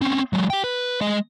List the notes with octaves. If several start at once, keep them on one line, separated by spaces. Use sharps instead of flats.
C4 C#4
F#3 G#3
G4 G5
B4
G#3 D#5